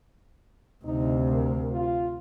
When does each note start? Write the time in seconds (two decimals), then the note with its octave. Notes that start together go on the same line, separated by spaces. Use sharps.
0.85 D2 C3 D#4
1.33 A#4
1.71 F4